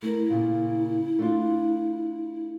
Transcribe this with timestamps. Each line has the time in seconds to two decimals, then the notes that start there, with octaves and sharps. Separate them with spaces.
0.02 A3 E4 A#4
0.29 A#2 C#3 F4
1.19 A3 D4 F4